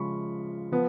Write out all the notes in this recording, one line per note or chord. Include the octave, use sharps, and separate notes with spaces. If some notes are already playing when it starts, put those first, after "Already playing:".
Already playing: C#3 F3 G#3 C#4 B5 C#6
F3 B3